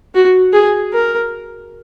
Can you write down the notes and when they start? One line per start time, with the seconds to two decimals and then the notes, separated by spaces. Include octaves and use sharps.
0.14 F#4
0.53 G#4
0.93 A#4